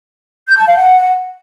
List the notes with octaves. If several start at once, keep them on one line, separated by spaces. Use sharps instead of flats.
G6
A5
F5
F#5